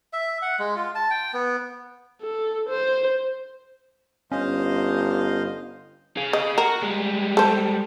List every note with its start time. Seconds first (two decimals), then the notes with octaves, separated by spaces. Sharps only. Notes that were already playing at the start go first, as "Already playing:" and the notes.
0.13 E5
0.42 F#5
0.59 G#3
0.76 F4
0.95 A5
1.10 G5
1.34 B3
2.22 A4
2.69 C5
4.32 G1 C#4 C5 D#5 F5
6.17 G#4 F5
6.33 D#5
6.58 F#4 A#4
6.83 G3 G#3
7.37 A4 C5